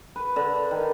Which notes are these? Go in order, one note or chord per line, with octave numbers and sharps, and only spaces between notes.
B4
D3
D#3